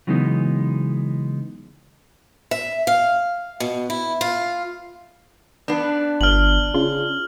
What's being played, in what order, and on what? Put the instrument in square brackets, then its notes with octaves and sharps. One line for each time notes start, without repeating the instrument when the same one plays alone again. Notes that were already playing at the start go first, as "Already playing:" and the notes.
[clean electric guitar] C#3 E3 F#3 G#3 B3 D#4
[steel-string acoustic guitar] E5
F5
B2
E4
F4
[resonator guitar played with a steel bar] B3 D4
[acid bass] G1 [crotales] F6 F#7
[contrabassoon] C#3 [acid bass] F4